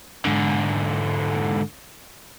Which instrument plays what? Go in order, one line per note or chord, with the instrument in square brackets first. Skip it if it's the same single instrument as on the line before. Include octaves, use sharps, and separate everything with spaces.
[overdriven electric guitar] G#2 D3